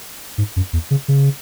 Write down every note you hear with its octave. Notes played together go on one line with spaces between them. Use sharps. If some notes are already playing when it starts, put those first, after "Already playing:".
G#2
F#2
E2
C#3
C#3